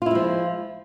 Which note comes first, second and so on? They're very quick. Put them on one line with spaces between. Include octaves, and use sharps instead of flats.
F4 E4 G#3 F3